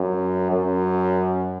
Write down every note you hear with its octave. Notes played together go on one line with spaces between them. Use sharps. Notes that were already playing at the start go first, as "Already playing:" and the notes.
Already playing: F#2
F#2